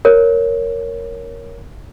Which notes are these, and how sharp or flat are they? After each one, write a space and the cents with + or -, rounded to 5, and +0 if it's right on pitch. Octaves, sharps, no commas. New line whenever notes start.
A#4 +0 C#5 +0